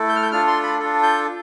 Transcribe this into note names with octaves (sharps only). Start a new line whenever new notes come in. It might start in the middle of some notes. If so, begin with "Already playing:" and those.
Already playing: A3 E4 A4
G6
F6
G6
D4 F4 A4 F6
C6
B5
D4 F4 A4
G6